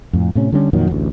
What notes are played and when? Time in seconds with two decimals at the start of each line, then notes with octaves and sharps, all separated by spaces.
0.13 F2 A2
0.35 A2 C3 C#4
0.52 D3 G3 C#4
0.73 F2 A#2 D#3 F#3
0.91 A1 D2